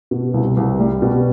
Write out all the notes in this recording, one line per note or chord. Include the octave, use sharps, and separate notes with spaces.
B2
C2
C2
G3
B2